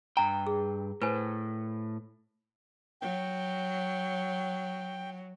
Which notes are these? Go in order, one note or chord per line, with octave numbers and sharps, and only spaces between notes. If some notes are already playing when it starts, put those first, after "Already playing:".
G2 G5 A#5
G#4
A2 B4 C5 G#5
F#3 G5